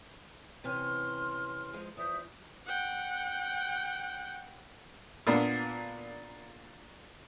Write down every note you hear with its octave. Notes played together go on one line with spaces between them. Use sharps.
C3 E3 C#4 C6 F6
F3 G#3 F4
E2 F3 E5 D#6 G6
F#5 G5
A#2 A#3 B3 D4